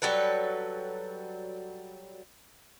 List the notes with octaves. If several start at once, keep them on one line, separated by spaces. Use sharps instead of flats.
F#3 G3 A4 B4